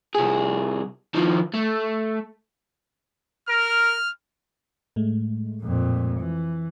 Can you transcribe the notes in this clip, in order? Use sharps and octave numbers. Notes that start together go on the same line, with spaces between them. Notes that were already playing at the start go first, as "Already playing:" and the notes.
C2 G#4
D#3 F3
A3
A#4 F6
A2 G#3 A3
F2 A#2
E3